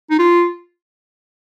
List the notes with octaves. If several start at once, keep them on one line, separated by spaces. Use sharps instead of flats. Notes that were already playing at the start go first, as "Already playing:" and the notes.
D#4
F4